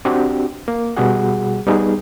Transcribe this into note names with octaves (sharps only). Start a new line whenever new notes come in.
C4 D4 F#4 G4
A#3
B2 G3 F#4 G#4 F#5
G3 B3 D#4 G#4